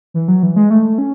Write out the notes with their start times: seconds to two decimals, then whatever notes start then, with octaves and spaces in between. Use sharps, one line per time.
0.14 E3
0.28 F#3
0.43 E3
0.56 G#3
0.70 A3
0.98 C#4